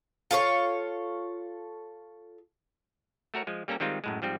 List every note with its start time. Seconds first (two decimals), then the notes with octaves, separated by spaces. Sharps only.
0.31 F4 A4 C5 C#5
3.34 A3 F#4 A#4 C#5
3.47 F3 G#3
3.68 G3 A#3 C#4 A4 A#5
3.80 D#3 G3 G#3 C4 D#4 F4
4.04 F#2 A2 G#3
4.22 G#2 F3 G3 C4